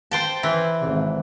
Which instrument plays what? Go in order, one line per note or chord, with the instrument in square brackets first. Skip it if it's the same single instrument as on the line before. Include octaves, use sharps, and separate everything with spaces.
[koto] C5 G5 A5
E3
[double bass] G#1